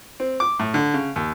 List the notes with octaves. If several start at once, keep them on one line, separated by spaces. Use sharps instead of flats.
C4
D6
A2
D3
C#3
D#2